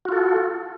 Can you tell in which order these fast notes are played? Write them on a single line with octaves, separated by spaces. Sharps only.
F#4 F4 A4